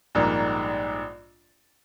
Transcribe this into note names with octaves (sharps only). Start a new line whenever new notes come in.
A#1 G#2 G3 A#3